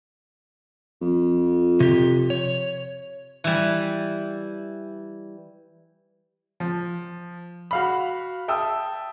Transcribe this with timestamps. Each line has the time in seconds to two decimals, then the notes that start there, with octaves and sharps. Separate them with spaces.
1.02 F2
1.80 C3 G4
2.30 C#5
3.44 E3 G3
6.60 F3
7.71 F#4 F5 B5
8.48 E5 G5 A5 D#6 E6